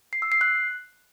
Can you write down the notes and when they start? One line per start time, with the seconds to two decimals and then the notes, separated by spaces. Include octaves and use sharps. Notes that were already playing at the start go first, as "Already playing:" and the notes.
0.13 C7
0.22 E6
0.32 C7
0.41 F#6